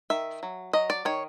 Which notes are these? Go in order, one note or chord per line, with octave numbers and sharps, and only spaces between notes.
D#3 E5
F#3
F#3 D#5
D5
D#3 C#5